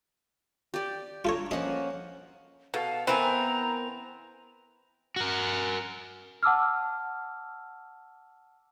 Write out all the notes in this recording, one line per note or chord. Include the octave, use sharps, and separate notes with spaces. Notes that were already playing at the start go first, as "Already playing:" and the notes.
G4 D5
D4 F4 A4 C#5 A#5
F3 A#3 C#4 D#5 F#5
B2 A4 F5
E3 B3 C4 A#4 G#5 A#5
F#4 A#4
F#5 A5 D6 E6 F6